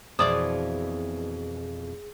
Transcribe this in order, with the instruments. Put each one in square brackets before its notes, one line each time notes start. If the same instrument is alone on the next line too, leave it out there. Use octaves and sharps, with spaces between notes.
[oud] F2 B2 E3 [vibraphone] G#4 [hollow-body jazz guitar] C5 D5 [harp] D#6